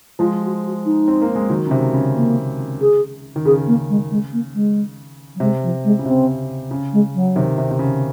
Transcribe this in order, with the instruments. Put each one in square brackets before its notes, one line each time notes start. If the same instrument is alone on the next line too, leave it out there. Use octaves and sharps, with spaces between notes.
[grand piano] F3 G#3 [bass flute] F4
[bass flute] F#4
F#4
D#4
[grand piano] C4
A#3
G#3
D#3 F#3
C#3
C3 D#3
C#3
[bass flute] A#3
G#4
[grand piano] D#3
[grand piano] C#3 [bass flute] G#4
[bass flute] A#3
G#3
G#3
A#3
G#3
F#3
[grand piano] C3 [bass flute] G#3
[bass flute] F3
G#3
[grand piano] C#3
[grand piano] C3 [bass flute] C4
[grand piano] C#3
[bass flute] G#3
F#3
[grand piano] C3 D#3
C3
C3
C#3